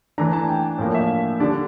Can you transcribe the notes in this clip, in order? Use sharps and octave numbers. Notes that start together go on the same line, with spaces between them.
E3 A3 D4 A#5
A5
G5
A2 F3 A#3 D4
E5
D3 G3 D4 D5